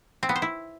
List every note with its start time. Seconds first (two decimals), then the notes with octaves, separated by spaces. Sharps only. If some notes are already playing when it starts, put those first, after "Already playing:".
0.23 C4
0.29 B3
0.36 C5
0.42 E4